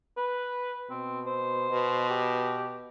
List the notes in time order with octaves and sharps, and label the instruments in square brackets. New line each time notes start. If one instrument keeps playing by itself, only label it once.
[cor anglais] B4
[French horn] B2 [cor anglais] C4
[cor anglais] C5
[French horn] B2
[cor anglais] G4